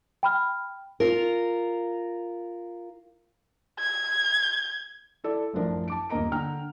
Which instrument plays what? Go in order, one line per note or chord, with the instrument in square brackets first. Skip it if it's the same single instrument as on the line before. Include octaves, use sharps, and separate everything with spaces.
[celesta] G5 B5 F6
[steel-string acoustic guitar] F4 A#4
[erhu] G#6
[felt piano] E4 A4 D5
A1 F#2 F3 D4 A#4
A5 D6 D7
D#1 G2 A#3 D#5 A#5 D7
D3 G5 A#5 F6